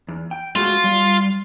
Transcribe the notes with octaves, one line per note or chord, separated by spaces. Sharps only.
E2
G5
G#3 A3 F4 F#4
G3